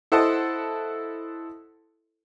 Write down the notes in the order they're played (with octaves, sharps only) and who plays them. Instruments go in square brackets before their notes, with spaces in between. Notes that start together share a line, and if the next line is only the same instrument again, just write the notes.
[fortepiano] E4 A4 C5 D#5 F#5 A5